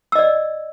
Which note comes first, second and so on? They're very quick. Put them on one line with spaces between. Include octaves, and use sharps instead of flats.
E6 D#5 D5